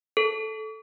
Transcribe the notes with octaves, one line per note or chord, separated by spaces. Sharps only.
A4